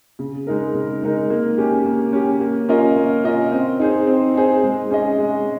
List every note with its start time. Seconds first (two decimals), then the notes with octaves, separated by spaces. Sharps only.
0.19 C#3
0.47 G#3 D#4 A#4
0.74 C#3
1.02 G#3 D#4 A#4
1.30 A#3
1.58 C#4 G4
1.85 A#3
2.13 C#4 G4
2.41 A#3
2.69 C#4 F4 A#4 D#5
2.96 A#3
3.24 C#4 F4 A#4 D#5
3.52 C4
3.80 D#4 G#4 C5
4.07 C4
4.35 D#4 G#4 C5
4.63 G#3
4.91 C#4 G#4 D#5
5.18 G#3